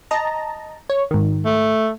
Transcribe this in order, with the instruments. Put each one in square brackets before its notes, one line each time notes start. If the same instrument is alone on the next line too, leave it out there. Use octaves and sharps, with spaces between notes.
[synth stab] D#5 A5 A#5
C#5
G#2 D#3
[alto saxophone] A3